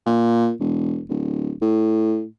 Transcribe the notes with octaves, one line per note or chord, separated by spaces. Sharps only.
A#2
E1
D1
A2